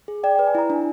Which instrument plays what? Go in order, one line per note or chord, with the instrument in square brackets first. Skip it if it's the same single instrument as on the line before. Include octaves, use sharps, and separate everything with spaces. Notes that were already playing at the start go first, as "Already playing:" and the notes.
[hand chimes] G#4
[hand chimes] D5 [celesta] G5
[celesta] G5
[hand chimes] B4
[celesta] G#5
[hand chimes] E4 [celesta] A#5
[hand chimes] D4